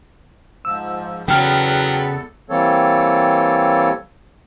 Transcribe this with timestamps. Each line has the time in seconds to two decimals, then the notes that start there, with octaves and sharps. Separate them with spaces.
0.65 G#2 F3 E6
1.28 E2 C#3 F#3 B3 A4 B4 G5 F6
2.50 E3 G3 A#3 C4 A4 C#5